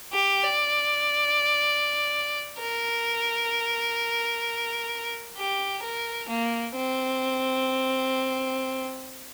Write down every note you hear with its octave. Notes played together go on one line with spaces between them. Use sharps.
G4
D5
A#4
G4
A#4
A#3
C4